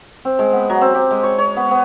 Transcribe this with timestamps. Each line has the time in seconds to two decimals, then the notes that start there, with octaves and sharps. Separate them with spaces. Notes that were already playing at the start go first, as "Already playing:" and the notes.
0.25 C4
0.39 G#3
0.53 B3
0.70 F#3
0.81 C4
0.94 G4
1.11 G#3
1.23 C#5
1.39 C#5
1.57 B3
1.71 B3